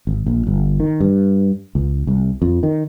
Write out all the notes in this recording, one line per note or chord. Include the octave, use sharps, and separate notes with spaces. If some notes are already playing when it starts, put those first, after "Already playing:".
G#1
A#1
G1
D#3
G2
C#2
C2
F2
D#3